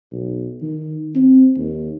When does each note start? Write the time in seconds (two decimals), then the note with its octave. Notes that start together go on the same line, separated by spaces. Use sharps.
0.12 B1
0.62 D#3
1.15 C4
1.57 D#2